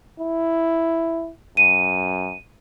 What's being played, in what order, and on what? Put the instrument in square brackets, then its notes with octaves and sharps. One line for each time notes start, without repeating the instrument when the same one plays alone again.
[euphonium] E4
[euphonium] F#2 [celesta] D#7